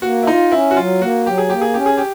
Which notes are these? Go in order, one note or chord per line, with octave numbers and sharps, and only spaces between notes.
A#3 F#4
E4
D#4 F4
C#4 E4
F#4
F#3 F4
A#3 F#4
F#3 G4
G#4
A#3 G4
G#4
C#4 G4
G#4
G4